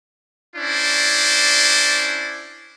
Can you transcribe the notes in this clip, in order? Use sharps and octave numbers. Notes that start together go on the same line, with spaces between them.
C#4 D4 E4 C5 D5